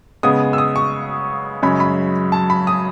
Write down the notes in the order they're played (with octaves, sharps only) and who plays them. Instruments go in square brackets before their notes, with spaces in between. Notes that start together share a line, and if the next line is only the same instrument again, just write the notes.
[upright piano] C#3 G#3 B3 D#6
E6
D#6
C#6
F#2 C#3 G#3 C#4 B5
B5
A5
B5
D#6